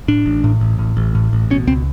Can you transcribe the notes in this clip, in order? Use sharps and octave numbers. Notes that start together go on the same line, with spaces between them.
A2 D4
A1
A2
A1
A2
A1
A2
A1
B2 C#4
C#2 C4